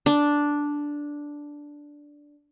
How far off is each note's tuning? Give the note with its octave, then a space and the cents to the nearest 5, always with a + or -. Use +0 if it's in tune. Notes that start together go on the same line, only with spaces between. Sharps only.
D4 -5